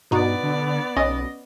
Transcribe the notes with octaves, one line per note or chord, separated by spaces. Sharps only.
G2 B2 B3 D#4 F#4 D5
D3
B1 C#4 D#5